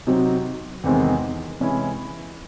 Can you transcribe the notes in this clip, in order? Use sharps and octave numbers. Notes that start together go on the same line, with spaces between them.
C3 F#3 C4 D#4
E2 C3 D#3 G#3 C4
C3 E3 G#3 C#4 E4